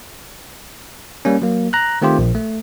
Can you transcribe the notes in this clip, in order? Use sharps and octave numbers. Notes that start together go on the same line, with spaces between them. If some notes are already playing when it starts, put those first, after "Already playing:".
G3 A#3 C#4
F#3 A#3
A#5 F#6
D#3 A3 C4 F4 G4 C5
A#1
A3